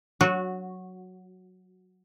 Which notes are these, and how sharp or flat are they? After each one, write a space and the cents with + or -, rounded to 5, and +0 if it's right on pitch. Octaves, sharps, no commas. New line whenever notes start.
F#3 +0 F#4 -15